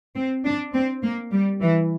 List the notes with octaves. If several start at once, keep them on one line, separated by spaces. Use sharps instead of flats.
C4
D4
C4
A#3
G3
E3